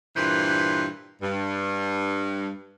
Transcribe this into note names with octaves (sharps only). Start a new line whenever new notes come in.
G2 A#2 E3 B4 C5
G2